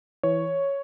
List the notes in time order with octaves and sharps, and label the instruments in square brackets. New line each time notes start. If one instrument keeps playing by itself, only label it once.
[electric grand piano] E3 C#5